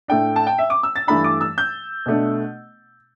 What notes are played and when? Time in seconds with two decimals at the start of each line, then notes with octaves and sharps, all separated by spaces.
0.08 A2 A3 D4 G5
0.36 A5
0.47 G5
0.58 E5
0.70 D6
0.83 E6
0.96 A6
1.07 G2 E3 A3 D4 B5
1.24 D6
1.41 E6
1.58 G6
2.06 B2 A3 D4